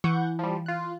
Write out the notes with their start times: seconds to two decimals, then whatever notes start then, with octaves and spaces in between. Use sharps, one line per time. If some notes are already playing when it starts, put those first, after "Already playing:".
0.04 E3 F#5 C#6 G6
0.39 F3 G3
0.66 F4 F#6